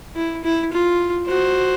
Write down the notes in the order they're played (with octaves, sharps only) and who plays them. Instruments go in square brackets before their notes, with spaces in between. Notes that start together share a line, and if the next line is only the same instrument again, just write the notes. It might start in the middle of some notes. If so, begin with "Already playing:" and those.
[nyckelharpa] E4
E4
F4
[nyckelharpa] F#4 [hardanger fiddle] C5